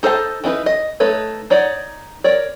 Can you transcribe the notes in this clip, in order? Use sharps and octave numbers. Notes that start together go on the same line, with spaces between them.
D#4 A4 C5 E5 A5
E3 D4 D#4 B4
D#5
A3 D#4 A4 B4 C#5
D#4 C#5 D5 F#5
A#4 C#5 D5